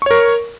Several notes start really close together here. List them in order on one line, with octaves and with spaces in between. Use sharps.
C#6 C#5 A#4